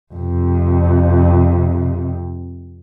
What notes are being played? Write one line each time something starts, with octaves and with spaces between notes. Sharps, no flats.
F2 C3